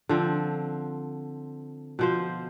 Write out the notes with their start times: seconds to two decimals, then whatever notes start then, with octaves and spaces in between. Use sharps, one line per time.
0.09 D3 F3 C4
1.99 B2 F3 C5